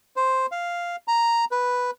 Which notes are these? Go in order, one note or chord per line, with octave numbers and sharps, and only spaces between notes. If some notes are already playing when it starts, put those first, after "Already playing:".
C5
F5
A#5
B4